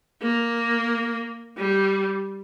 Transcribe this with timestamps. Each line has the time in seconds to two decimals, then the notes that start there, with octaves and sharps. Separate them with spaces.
0.22 A#3
1.57 G3